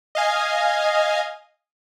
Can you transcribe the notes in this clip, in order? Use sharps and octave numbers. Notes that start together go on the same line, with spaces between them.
D#5 F5 G#5